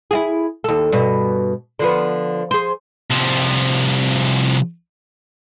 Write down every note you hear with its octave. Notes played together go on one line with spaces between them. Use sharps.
E4 F#4 G#4
D#2 A4
G2 B2
D3 F3 B3
G#4 C5
C2 F3